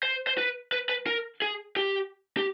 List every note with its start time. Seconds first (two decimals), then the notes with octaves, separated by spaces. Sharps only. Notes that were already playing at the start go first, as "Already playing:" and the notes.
0.03 C5
0.27 C5
0.38 B4
0.72 B4
0.89 B4
1.07 A#4
1.42 G#4
1.76 G4
2.37 G4